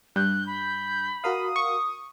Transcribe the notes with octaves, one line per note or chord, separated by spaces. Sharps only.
G2 F#6 G6
B5
F#4 A#4 F5 D#6
C#6